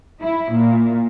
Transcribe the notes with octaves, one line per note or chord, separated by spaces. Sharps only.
E4
A#2